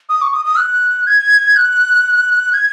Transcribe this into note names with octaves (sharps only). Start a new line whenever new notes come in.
D#6
C#6
D#6
D#6
F#6
G#6
F#6
G#6